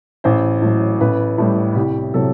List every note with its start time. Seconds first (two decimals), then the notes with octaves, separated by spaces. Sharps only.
0.24 A1 C5
0.62 A2 F#3
1.01 A1 B4
1.38 A2 G3
1.75 C2 G4
2.14 C3 F#3 A4